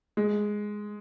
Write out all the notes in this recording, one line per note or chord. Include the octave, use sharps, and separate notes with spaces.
G#3